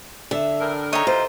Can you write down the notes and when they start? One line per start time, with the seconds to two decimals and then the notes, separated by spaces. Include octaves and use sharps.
0.31 D3 E5
0.61 A2 A#4
0.93 D#3 A3 C#5 D#5 A#5
1.07 C3 E3 F4 C5